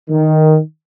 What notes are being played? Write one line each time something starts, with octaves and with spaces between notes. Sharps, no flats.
D#3